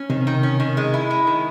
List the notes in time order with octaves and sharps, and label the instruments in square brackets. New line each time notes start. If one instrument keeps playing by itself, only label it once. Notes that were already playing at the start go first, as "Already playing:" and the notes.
Already playing: [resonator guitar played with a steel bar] C#4
[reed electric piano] C3 [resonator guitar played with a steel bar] D#3
[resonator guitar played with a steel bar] D#3
C#4
D#3
G#3
E4
G#3
D#3